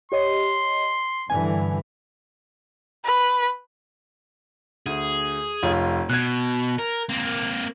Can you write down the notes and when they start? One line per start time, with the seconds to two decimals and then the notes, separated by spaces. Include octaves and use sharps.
0.12 G4 C#5 D#5 C6
1.30 G2 D3 E3 G#5
3.05 B4
4.86 D2 G#4
5.63 F1 F4 C#5
6.10 B2 F#6 G#6
6.79 A#4
7.09 A#3 C4